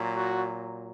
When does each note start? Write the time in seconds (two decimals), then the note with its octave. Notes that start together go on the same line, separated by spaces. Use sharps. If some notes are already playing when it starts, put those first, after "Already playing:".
Already playing: A#2 F#3
0.16 F#4